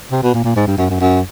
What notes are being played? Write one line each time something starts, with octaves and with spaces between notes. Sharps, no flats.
C3
B2
A#2
A#2
G#2
G2
F#2
F#2
F#2